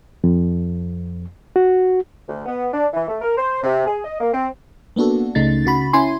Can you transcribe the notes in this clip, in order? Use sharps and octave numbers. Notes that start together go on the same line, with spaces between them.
F2
F#4
D2
B3
D4
E3
A3
A#4
C5
C3
G#4
D#5
A#3
C4
A#3 B3 D4 F#4 A4
C#2 C#3 A3 D#4 A6
C#3 F#4 B5
C#4 E4 G#5 C6